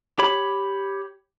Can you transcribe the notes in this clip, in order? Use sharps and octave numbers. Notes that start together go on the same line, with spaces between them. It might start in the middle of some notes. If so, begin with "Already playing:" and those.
G4 C#5 B5